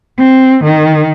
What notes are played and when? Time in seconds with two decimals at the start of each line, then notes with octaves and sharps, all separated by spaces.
0.18 C4
0.64 D#3